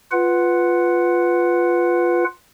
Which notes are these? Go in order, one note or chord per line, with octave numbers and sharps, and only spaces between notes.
F4 B4 F#5